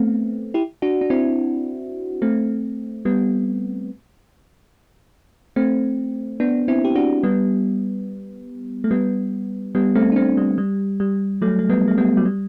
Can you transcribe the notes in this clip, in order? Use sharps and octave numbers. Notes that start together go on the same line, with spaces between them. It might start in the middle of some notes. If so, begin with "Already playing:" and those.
Already playing: A3 B3 C4
E4 G4
D4 F#4
D4
C4 E4
A3 C4
G3 B3
A3 C4
B3 D4
C4 E4
G4
D4 F#4
G3 B3
A3
G3 B3
G3 B3
A3 C4
D4
A3 C4
G3
G3
G3
F#3 A3
A3
G3 B3
A3
G3 B3
F#3
G3